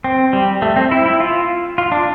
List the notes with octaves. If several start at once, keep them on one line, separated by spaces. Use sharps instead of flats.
C4
G3
A3
C4
E4
E4
F4
F4
D4